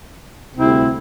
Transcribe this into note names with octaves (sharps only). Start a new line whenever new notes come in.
D2 C3 G3 C4 E4